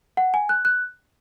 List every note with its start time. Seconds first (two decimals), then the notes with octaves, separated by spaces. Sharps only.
0.17 F#5
0.34 G#5
0.49 F#6
0.65 F#6